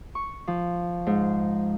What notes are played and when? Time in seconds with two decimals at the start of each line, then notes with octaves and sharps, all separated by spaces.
0.15 C#6
0.47 F3
1.06 G#2